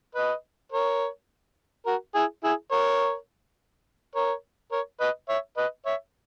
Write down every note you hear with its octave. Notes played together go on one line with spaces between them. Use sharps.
B4 D#5
A#4 C#5
F#4 A#4
E4 G#4
E4 G#4
A#4 C#5
A#4 C#5
A#4 C#5
B4 D#5
C#5 E5
B4 D#5
C#5 E5